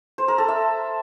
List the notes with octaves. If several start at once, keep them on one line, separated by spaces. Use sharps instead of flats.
C5
A#4
A4
E5